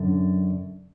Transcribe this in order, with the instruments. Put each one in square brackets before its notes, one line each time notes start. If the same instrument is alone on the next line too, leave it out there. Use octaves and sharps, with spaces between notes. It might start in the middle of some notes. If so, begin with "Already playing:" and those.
Already playing: [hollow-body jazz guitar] F#2 D3